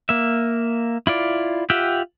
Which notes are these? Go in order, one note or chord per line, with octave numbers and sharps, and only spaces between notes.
A#3 E5
E4 F4 D5
F4 G4 E5 F#5 G5